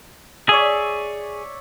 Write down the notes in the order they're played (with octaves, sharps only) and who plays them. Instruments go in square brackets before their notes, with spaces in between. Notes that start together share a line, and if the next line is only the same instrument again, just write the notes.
[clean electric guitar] G#4 [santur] C#5 D5 E5